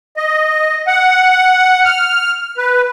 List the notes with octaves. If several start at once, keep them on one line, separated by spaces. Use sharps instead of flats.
D#5
F#5
F6
B4